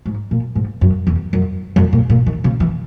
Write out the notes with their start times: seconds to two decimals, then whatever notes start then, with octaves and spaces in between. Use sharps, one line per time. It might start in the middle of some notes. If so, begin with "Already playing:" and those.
0.06 G#2
0.31 A#2
0.55 G#2
0.81 F#2
1.07 E2
1.33 F#2
1.76 F#2
1.93 A#2
2.10 A#2
2.26 D#3
2.44 C#3
2.60 E3